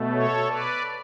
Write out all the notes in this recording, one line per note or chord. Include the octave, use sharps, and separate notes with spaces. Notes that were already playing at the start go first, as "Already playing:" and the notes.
Already playing: B2 A3
A4 C#5
B4 D5